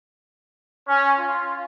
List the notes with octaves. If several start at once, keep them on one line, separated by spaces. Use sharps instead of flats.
C#4
F4